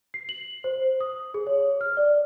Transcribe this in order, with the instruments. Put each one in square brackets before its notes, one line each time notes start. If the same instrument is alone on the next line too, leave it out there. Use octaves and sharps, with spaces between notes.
[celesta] C7
F#7
C5
D#6
G#4
C#5
F6
D5